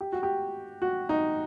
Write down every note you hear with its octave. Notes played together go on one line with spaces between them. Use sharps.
G4
F#4
G4
F#4
D#4